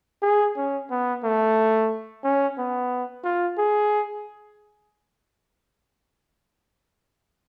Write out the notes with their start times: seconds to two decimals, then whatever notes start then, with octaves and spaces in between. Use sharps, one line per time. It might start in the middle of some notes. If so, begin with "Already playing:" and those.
0.22 G#4
0.57 C#4
0.90 B3
1.24 A3
2.23 C#4
2.58 B3
3.24 F4
3.58 G#4